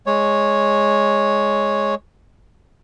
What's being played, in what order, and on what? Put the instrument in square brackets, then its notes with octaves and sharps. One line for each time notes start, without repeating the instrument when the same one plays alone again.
[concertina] G#3 C#5